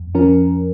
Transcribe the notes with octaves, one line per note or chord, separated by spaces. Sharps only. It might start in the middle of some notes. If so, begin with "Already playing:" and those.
Already playing: F2
F3 C#4 A#4